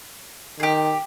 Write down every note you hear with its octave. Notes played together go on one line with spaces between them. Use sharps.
D#3 G4 G#4